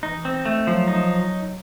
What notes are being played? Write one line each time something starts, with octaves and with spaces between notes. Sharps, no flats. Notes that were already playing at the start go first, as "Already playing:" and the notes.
E3 D#4
C4
A3
F3 F#3
D#4